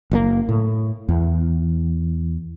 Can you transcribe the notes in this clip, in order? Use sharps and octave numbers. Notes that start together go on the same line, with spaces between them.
F#1 A2 A#3
A2
E2